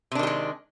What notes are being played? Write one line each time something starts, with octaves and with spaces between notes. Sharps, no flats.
C3 D#3 G3 G#3 D4